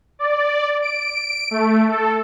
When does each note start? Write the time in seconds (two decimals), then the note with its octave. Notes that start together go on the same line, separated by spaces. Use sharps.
0.19 D5
0.82 D7
1.51 A3
1.89 A4